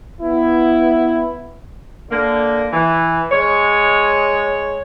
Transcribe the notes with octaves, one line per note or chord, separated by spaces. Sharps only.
B3 E4
D3 A#3
E3
G#3 C#5